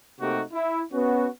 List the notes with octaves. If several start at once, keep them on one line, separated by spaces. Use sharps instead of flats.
C3 A3 A#3 D#4 F#4 G4
E4
B3 C#4 F#4